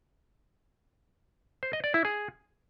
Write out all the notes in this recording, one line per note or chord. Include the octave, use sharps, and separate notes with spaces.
C5
D#5
D5
E4
G#4